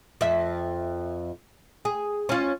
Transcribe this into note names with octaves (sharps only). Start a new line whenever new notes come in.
F2 E5
G#4
C#4 F4